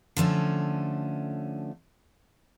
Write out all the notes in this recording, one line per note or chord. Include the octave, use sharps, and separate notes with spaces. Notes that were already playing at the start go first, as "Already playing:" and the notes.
D3 F3 A3 C#4